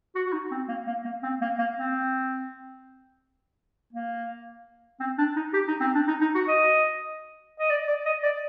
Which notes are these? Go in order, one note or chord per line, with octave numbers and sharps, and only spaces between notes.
F#4
F#4
D#4
C4
A#3
A#3
A#3
C4
A#3
A#3
C4
A#3
C4
D4
D#4
G4
D#4
C4
D4
D#4
D#4
F#4
D#5
D#5
D5
D5
D#5
D5